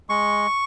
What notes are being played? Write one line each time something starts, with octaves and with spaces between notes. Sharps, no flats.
G#3 C#6